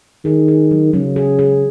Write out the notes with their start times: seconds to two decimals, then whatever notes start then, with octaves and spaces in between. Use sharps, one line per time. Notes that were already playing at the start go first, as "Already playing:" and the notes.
0.25 D#3 G#4
0.48 G#4
0.71 F#3
0.93 C#3 F#3
1.16 G#4
1.39 G#4